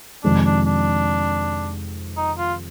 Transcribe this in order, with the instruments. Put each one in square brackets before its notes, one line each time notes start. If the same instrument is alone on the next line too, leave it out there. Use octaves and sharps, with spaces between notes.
[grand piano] F2 C3 D#3 G#3 C4 [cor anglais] D4
[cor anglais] D4
D4
D#4
F4